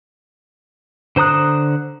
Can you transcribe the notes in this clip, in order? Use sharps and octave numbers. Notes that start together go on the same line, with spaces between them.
D3 C5 A#5 D#6 F#6